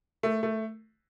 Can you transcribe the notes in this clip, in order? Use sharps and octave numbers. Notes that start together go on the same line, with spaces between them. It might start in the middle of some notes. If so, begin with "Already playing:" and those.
A3
A3